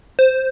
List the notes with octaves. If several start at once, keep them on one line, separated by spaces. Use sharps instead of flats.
C5